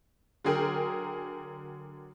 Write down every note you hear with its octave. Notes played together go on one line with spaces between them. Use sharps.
D3 F#3 G#4 A#4 G5